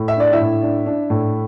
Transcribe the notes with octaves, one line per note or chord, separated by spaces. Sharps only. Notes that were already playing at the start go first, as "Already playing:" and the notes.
Already playing: A2
E5
D4 D5
E4 E5
A2
D4
D4
A2